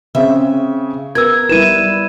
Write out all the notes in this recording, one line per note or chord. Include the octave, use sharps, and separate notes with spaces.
C#3 C4 G#4 E5
B3 A#4 E6 G#6
G3 E4 B4 D#7 E7